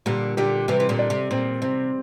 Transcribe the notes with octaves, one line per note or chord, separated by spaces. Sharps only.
A#2 D3 G3
A#2 D3 G4
C3 E3 G3
E3
A#2 D3
D5
C3
A#2 C4
C3 C4